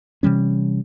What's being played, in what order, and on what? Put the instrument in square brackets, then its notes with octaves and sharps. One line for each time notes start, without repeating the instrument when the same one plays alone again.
[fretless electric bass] C3 E3 G3 C#4